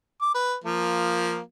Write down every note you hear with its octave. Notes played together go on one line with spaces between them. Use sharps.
D6
B4
F3 A#3